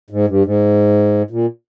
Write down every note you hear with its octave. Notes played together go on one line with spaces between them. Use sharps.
G#2
G2
G#2
A#2